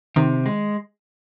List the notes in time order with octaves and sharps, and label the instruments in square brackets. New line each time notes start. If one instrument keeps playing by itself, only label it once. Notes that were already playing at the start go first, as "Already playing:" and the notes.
[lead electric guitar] C3 [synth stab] D#3
[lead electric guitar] G#3